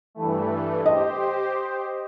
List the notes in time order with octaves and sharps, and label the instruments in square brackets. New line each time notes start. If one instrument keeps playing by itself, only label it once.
[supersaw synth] G2 E3 A3
[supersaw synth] G4 C5 [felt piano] D#5